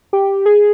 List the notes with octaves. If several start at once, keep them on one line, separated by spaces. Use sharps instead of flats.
G4
G#4